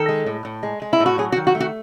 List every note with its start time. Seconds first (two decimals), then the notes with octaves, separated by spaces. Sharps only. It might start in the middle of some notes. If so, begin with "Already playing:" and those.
Already playing: D#3 A4
0.09 G#3
0.26 A2
0.45 A2
0.63 G#3
0.82 G#3
0.93 E4
1.00 A2
1.06 F#4
1.18 F#3 G#4
1.32 F#4
1.36 D#3
1.47 F#4
1.55 A3
1.60 F#4